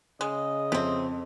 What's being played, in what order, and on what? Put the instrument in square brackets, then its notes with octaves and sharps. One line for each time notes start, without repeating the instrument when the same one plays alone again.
[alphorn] C#3 [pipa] G#3 [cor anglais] D#5
[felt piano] F2 [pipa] C3 C4